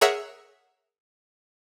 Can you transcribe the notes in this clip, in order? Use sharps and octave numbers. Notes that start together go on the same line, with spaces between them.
G#4 A#4 C#5 E5 F#5 E6